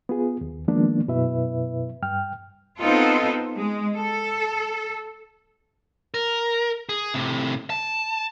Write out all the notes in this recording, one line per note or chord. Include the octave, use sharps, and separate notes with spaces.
B3 F4 G#4
D#2
D#3 F3 G#3 A#3 B3 D4
F#2 B2 E4 B4 E5
G2 G5 F6
B3 C4 D#4 F4 A4
G#3
A4
A#4
G#4
A2 C3
A5